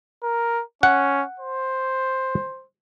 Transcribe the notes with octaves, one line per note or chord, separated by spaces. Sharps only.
A#4
C#4 F#5
C5